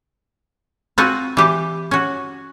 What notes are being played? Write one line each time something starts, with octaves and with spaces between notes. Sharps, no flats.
C4 F4 F#4 F#5 G#5
E3 G4 A5
C#4 F#4